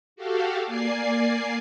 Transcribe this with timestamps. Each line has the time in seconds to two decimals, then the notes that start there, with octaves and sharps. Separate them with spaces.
0.16 F#4 G4 A4 F5
0.64 A#3 D5 G#5 C7